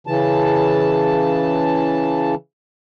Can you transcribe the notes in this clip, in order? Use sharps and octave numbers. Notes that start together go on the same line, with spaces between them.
C#3 E3 A5